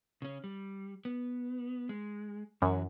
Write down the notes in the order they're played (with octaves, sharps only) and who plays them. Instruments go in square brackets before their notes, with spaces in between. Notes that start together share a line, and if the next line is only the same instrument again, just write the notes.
[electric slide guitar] C#3 C#4
G3
B3
G#3
[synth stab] F#2 [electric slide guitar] E3 F#4